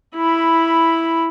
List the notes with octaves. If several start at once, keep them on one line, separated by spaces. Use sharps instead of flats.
E4 B5